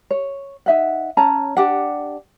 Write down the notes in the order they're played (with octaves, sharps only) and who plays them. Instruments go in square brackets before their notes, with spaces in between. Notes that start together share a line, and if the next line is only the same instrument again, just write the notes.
[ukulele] C#5
D#4 E5 F#5
C#4 A5 A#5
D4 G4 F#5